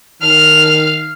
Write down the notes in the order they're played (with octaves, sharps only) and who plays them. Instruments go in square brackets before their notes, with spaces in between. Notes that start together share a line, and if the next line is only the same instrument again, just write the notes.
[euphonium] D#3 [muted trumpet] F5 [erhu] F6